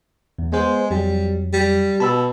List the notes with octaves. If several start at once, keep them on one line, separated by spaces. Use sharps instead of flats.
E2
G#3 B3 C5
F2 F#3 G3
G3
B2 A5 B5 E6